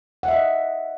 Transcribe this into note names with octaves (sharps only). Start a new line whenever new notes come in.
D#5 E5 F#5